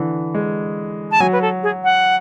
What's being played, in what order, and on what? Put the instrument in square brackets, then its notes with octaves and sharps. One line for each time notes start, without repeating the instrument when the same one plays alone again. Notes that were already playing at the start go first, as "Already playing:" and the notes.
Already playing: [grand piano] D3 E3
G#3
[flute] A5
[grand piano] F#3 [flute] G#5
[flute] B4
A4
G#4
F#5